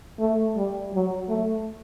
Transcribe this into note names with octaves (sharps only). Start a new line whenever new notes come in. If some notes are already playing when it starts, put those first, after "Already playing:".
A3
G3
F#3
A3